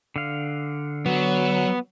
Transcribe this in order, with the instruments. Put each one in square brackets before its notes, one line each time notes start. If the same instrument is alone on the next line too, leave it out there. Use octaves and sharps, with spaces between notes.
[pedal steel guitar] D3 F5
[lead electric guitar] F#3 [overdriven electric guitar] B3